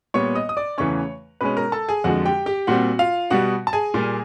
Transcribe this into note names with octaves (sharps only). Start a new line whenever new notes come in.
A#2 G3 B3 C#5 C#6
D#5 D#6
D#6
D5 D6
E2 C#3 E3 A3 C#4 C#5 C#6
B2 G#3 C#4 B4 B5
A#4 A#5
A4 A5
G#4 G#5
F2 D3 F3 G#3 F#4 F#5
G4 G5
G4 G5
A#2 G3 C4 F#4 F#5
F4 F5
B2 G3 B3 F#4 F#5
A5
G#4 G#5
A#2 G3 A#3